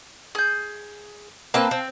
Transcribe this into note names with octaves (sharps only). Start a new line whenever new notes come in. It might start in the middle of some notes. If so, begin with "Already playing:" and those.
G#4 G6
A#3 C4 B4 F5 A5 F#6
C4